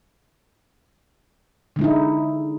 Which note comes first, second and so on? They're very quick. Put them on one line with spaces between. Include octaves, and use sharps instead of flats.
D3 G#3 E4 D#4